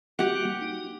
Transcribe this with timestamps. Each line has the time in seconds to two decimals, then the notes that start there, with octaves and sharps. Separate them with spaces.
0.19 G3 A#3 F#4 G4 F#5
0.61 D#4